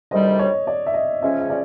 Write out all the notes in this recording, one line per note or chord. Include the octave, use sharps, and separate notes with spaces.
D2 C3 D#3 G3 D#5
C#5
D5
E5
D#5
C#3 F3 G#3 C#4 E5
E5
D5